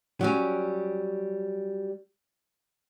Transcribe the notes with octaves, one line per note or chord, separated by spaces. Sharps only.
F#3 G3 C#4